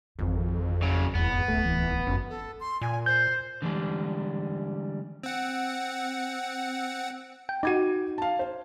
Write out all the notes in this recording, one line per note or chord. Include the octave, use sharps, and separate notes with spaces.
G#1 F2 E3
C#3 F#3
F1 E2 G#2 B3
D1 C2 A3
E3
G1 F#2 E3
A4
C6
A#2 G#5
C5 G6
D3 E3 G3 G#3
C4 F#5
G5
D#4 F#4 D6 G#6 D#7
F5 A5
C5